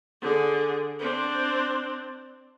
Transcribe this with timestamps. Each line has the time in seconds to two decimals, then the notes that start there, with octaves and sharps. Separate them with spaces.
0.22 D3 G#4
1.00 C4 D4